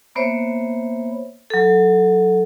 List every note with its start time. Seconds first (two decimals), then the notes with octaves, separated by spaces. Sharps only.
0.15 A#3 B3 C5 C#5 E5
1.50 F#3 A4